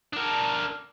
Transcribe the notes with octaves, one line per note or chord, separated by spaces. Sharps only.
D4 A#4